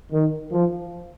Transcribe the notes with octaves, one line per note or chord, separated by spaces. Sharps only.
D#3
F3